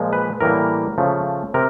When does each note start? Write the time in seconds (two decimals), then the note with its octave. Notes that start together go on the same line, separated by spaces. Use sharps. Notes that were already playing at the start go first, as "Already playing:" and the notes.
Already playing: A#2 F3 G#3
0.13 B4
0.41 A2 E3 G3 A#3 A#4
0.98 C#3 F3 A3
1.54 C3 A#4